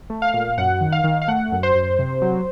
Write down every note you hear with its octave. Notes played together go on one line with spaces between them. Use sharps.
A3
F5
A#2
F#2 F#5
D#3
F5
D#3
F5
A3 F#5
F#2
C5
F#2
C3
F#3